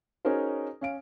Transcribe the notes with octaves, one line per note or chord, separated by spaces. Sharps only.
C#4 D#4 F#4 G#4 A#4 C5
C#4 F5 D7